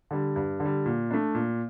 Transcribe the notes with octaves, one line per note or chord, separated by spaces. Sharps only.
D3 G3
G2
D3
G3
A#2
A3 D4
A#2